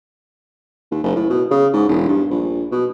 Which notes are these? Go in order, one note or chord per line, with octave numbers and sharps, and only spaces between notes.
D#2
F#1
A2
B2
C#3
G#2
E1
G2
A#1
B2